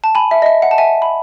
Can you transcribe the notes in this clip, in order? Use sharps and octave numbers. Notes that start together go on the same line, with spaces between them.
A5
G#5 B5
E5
D#5
E5
F#5
A5
E5 G#5
B5